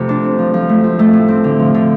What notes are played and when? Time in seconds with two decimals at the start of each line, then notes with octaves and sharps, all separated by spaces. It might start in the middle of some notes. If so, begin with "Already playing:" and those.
Already playing: F2 C3 A3
0.09 D4
0.24 C4
0.39 F3
0.54 F3
0.69 A3
0.83 F3
0.99 A3
1.13 A2
1.28 C4
1.44 D3
1.59 F3
1.74 D3